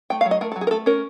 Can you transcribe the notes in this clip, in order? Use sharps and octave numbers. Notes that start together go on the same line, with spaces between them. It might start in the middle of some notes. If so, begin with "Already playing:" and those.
A3 G5
F5
F#3
D#5
A3 A#4
A4
F#3
G#4
A#4
A3 A4
C#4 A#4